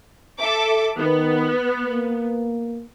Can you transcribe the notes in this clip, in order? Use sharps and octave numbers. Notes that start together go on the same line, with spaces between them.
A4 E5 D6
D#3 B3
A#3